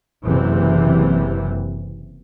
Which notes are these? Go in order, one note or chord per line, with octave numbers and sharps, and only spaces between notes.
F#1 C3 E3